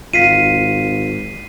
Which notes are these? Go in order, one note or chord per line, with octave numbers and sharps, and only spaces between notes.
G#1 F4 F5 B6 C7 D#7